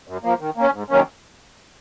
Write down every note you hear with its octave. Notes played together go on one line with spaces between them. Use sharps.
F#2
F3 A#3
D#3
A#3 C#4
G#2
D#3 F#3 A#3 C#4